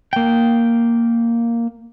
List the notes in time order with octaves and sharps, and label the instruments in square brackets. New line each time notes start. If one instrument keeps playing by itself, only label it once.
[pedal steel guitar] A#3 G5